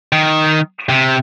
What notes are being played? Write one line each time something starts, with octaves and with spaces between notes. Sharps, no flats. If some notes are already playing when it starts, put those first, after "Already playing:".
D#3
C3